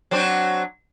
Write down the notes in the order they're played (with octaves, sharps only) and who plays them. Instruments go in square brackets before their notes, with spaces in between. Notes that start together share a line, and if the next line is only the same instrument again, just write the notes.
[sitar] F#3 C4 D4